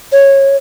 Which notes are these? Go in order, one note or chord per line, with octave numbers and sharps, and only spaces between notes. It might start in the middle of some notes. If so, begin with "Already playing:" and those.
C#5